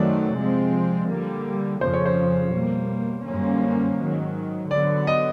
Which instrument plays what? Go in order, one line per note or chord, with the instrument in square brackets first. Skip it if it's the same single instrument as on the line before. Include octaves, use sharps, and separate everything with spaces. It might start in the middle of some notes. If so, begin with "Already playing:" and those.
Already playing: [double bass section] F#2 D#3 F#3 A3 C4 [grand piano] D5
[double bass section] C3 F3 G#3 C4
D3 G3 A#3
[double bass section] F2 C#3 F3 [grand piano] C5
[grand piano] C#5
C5
[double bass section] B2 G3 A#3
F#2 D3 G3 A#3 C#4
G#2 D#3 F#3
[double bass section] D3 F#3 B3 [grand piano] D5
[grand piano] D#5